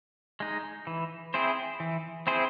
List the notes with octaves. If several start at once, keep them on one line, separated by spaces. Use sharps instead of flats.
G#3 D#4
E3
C4 E4 G#4 C5
E3
C4 E4 G#4 C5